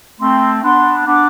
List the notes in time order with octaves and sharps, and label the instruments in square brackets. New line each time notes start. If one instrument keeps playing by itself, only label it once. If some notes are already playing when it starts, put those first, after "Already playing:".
[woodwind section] A3 C4 [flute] C6
[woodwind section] B3 D4 [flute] C6
[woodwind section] B3 D4 [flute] D6